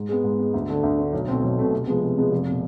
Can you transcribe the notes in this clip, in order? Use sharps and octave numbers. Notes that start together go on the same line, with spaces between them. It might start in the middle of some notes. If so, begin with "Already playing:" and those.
Already playing: G#2
G#3 B3
G#2
G#3 B3
D2
D3 A3
D2
D3 A3
B1
B2 A3 C4
B1
B2 A3 C4
C3
F3 G#3 B3
C3
F3 G#3 B3
F1
B2